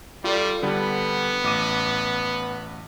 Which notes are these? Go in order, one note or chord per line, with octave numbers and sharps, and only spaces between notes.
G3 F4 A4 D5
D3 G3 B3
A1 D6 D#7